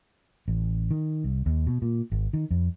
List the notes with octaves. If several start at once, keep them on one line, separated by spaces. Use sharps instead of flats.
A1
D#3
C2
D#2
B2
A#2
G#1
D#3
F2